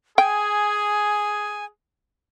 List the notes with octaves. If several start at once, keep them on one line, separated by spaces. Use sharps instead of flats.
G#4 G5 G#5